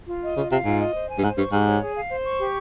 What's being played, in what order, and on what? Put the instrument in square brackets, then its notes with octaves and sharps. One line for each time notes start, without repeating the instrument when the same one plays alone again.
[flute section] F4
D#5
[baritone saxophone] C#3 [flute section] F4
[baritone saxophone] C3 [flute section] F5
[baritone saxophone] G#2 [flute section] F4
[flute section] D#5
C5
G#5
[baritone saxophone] G2
[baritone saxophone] G#2 [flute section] C5
[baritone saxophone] G2 [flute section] C#6
[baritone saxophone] G#2 [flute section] G4
[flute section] C#5
G#4
F5
C5
C#6
G4